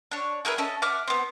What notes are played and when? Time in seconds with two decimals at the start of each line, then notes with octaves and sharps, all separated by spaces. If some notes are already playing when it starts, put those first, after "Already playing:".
0.11 D4 C#5
0.45 E4 G#4 A#4 B4
0.58 C#4 A4 D#5
0.82 E5 F#5 D6 F6
1.08 B3 C4